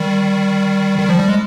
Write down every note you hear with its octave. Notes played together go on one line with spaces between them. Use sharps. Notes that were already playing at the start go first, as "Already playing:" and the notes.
Already playing: D#3 G3
D#3
F3
G3
G#3